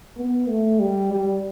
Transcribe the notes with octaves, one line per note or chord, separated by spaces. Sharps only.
B3
A3
G3
G3